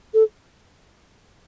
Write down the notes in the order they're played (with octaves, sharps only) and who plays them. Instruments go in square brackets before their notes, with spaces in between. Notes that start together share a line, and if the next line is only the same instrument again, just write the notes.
[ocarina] A4